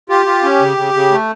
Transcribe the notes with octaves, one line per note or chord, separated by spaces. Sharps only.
F4 G4
F4
C#4
C#3
C#3
C#3
A3